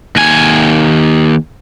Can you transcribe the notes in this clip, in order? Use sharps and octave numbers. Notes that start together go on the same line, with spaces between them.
D#2 G#5